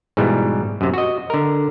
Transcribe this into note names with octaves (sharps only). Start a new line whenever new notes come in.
G#2 B2 E3 G3
F#2 C3
F#4 D#5
D3 A#4